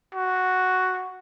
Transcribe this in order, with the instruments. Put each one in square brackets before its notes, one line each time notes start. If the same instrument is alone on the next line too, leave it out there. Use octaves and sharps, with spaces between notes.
[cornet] F#4